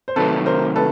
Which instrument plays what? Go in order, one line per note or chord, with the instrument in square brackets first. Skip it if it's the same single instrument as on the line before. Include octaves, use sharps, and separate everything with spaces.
[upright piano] C5
[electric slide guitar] C3 D#3 F#3 A3 [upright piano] A4 B4
[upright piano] A#4 C5
A4 B4